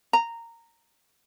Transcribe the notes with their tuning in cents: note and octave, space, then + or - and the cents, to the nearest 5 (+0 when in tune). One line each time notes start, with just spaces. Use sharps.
A#5 -15